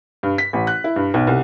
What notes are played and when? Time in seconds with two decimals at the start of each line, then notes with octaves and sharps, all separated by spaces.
0.23 G2
0.38 B6
0.53 A1
0.67 F#6
0.84 E4
0.96 G2
1.14 B1
1.27 C2